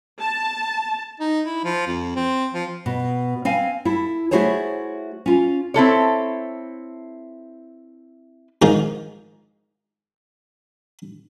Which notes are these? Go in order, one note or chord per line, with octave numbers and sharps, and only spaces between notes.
A5
D#4
E4
F3
F2
C4
F3
B2
C4 F5 G#5
E4 A4
A3 E4 F#4 G#4 C5 C#5
C#4 F4
C4 E4 A4 C#5
G#2 D#3 F3 G#3